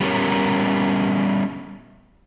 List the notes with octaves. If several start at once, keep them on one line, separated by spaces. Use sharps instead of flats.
G3 B3 C#4 G4 A#4